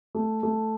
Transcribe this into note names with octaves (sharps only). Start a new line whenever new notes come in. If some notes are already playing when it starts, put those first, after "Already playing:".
A3
A3